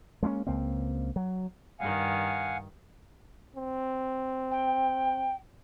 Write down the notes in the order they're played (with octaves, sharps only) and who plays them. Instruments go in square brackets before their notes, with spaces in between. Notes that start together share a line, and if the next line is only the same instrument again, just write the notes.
[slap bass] G#3 A#3 B3 C#4
C#2 A#3 C4
F#3
[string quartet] G2 D#3 [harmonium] F5 F#5 G#5
[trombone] C4
[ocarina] G5